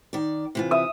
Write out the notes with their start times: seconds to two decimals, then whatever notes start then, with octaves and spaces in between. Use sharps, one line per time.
0.13 D#3 D5
0.55 C3 E3 F4
0.71 E5 D#6